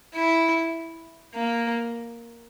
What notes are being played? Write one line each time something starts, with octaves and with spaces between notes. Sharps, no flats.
E4
A#3